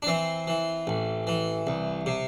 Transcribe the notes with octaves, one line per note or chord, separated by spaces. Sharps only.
D4
E3 C4
E3
A1
E3
C2
C3